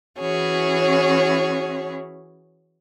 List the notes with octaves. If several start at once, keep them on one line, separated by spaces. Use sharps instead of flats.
E3 C#4 E4 F#4 G#4 C#5